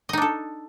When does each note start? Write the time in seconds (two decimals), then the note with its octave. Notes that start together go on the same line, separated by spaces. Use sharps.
0.09 D#5
0.13 D#4
0.17 D4
0.22 A4